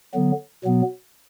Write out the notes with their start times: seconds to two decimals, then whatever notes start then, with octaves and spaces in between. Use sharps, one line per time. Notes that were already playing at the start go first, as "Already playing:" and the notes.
0.14 D3 F#3 B3
0.65 B2 F#3 B3